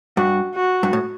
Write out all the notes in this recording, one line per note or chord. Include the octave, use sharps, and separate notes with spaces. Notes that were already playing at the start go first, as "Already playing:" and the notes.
G2 F#4
F#4
G2
A2